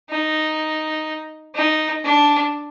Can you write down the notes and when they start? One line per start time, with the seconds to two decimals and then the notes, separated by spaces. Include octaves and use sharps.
0.10 D#4
1.55 D#4
2.04 D4